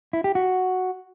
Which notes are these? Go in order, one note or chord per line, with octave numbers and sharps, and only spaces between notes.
E4
G4
F#4